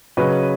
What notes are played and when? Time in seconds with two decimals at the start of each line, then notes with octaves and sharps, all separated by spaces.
0.17 C#3 F#3 C#4 B4 D#5